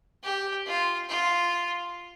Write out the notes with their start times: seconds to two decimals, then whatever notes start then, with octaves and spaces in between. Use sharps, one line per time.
0.23 G4
0.66 F4
1.09 F4